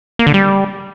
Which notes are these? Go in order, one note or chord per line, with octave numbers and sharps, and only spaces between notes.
A#3
D3
G3